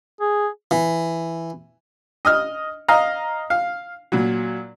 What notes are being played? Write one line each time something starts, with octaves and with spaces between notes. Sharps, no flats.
G#4
E3
D#5 D#6 F6
D#5 F5 A#5
F5
A#2 F#3